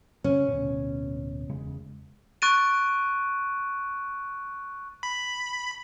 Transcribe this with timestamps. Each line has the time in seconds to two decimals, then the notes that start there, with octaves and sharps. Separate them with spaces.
0.24 C#3 C#4
0.49 D1 B2
1.49 E1 C#3 G#3
2.42 C#6 F#6 A6 D7 D#7
5.03 B5